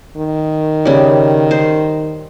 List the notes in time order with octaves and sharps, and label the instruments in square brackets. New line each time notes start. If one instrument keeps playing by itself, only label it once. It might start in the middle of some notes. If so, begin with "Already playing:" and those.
[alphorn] D#3
[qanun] C#3 G3
C5